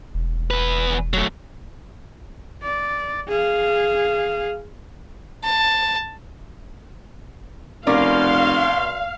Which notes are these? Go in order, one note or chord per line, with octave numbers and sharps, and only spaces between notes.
E1
E2 B4
F#3 A3
D5
G#4 F5
A5
F1 B2 C#4 A#4 D5 F5 C6